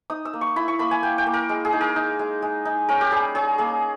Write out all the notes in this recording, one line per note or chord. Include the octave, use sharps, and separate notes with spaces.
D#4 D#6
E6
A#3
C#6
E4 B5
C#6
A#3 B5
G#5
A#3 G5
G5
A#3
A#4
G#3
G#4
D#4
A#4
D#4
G#3
G#3
D#4
C#4 A#4
G4
G3 G#4
C#4 G#4
A#3 G#4